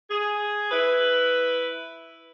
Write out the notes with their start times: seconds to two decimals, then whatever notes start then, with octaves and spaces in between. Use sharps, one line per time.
0.10 G#4
0.71 E4 B4